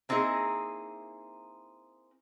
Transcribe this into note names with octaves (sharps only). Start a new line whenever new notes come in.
A#3 C4 D#4 E4 G#4